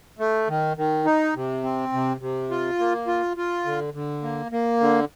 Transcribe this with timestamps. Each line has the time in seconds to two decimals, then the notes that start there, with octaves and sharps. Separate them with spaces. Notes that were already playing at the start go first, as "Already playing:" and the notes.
0.19 A3
0.48 D#3
0.77 D#3
1.05 D#4
1.35 C3
1.63 C4
1.93 C3
2.21 C3
2.51 F4
2.79 A#3
3.07 F4
3.37 F4
3.65 D3
3.94 D3
4.23 A#3
4.52 A#3
4.80 D3